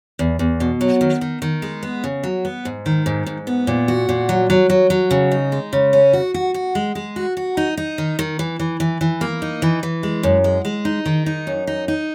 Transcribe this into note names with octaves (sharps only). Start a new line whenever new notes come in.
E2
E2
B2
F#3
D#3
D#3
D#3
G#3
B3
C#3
F#3
B3
G#2
D#3
G#2
G#2
B3
A#2
F#4
A#2
F#3
F#3
F#3
F#3
C#3
D#4
G#3
C#3
C#4
F#4
F#4
F#4
G#3
G#3
F#4
F#4
D#4
D#4
D#3
D#3
E3
E3
E3
E3
A#3
D#4
E3
E3
G#3
F#2
G#3
G#3
D#4
D#3
D#4
F#2
D#4
D#4